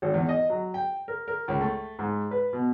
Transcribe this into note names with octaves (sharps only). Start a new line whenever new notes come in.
G#1
E2
D#5
F#3
G5
A#4
A#4
C#2
A3
G#2
B4
B2